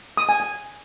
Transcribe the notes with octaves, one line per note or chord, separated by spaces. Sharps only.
D#6
G#5
G#5